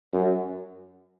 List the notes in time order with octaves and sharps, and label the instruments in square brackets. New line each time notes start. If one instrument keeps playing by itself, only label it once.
[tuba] F#2